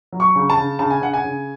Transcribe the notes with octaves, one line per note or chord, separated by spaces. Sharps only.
F#3
C#6
C#3
A5
C#3
C#3 A5
G#5
C#3 F#5
G#5
C#3